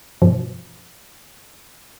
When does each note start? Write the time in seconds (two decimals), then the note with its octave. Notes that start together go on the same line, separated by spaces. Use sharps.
0.22 G2 B2 F3